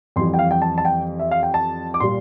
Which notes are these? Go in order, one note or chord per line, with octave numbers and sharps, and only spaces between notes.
F2 E3 G3 C6
G5
F5
G5
A5
A5
G5
E5
F5
G5
A5
D6
A#2 G3 C6